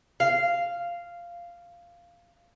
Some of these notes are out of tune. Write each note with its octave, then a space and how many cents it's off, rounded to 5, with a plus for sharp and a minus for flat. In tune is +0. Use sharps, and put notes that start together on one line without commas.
F5 -10